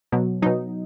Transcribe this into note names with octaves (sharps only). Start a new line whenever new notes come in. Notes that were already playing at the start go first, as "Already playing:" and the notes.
B2 F#3
B2 F#3 D#4